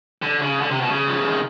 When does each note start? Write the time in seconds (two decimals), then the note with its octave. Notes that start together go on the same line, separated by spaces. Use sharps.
0.22 D3
0.42 C#3
0.61 D3
0.71 C3
0.81 B2
0.91 C#3
1.07 F3
1.18 E3
1.29 D#3